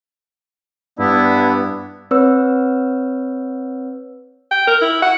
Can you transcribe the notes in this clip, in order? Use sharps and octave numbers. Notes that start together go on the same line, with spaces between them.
G2 B3 D4 E4
C4 B4 C#5 E6
G5
A#4
E4
F#5